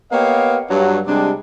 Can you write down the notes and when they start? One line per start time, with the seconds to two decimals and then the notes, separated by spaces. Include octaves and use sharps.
0.12 A#3 B3 G4 C#5 D#5 F5
0.70 G2 F#3
1.06 C3 G3 G#3 D4